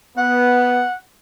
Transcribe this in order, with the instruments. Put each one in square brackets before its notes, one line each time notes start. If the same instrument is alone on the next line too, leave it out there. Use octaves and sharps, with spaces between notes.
[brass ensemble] B3 [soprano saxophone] F#5